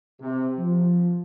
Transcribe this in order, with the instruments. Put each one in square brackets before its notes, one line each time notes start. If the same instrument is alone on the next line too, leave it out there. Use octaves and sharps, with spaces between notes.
[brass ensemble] C3
F3